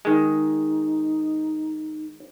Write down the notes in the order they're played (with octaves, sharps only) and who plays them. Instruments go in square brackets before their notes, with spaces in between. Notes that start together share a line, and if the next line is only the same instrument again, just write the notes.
[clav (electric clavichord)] D#3 G#3 [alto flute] D#4